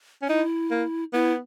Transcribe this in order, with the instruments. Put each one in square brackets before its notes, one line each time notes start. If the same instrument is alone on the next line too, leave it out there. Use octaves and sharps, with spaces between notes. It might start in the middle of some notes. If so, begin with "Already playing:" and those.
[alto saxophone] C#4
[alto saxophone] D#4 [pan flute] E4
[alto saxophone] A#3
[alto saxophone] B3 [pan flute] E4